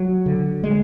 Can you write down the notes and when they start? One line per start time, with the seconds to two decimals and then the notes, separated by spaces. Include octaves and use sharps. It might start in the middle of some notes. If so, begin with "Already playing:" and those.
Already playing: F#3
0.26 D3
0.64 G#3